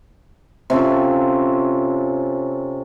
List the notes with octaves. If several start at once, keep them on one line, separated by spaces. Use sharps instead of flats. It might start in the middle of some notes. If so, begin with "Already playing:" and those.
C3 C#4 F4 A4